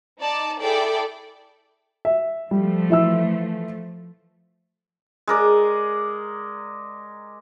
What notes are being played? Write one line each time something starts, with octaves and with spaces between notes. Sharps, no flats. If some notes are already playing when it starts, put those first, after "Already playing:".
D#4 D5 A5
E4 G#4 A4 D5 G5
E5
F3 G3 A3
E3 E4 E6
G#3 A#4 D5